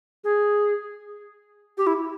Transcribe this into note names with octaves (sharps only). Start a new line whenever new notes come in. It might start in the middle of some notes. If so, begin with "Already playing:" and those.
G#4
G4
E4